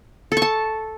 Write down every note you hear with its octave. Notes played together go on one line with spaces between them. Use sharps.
A4
C#6
A5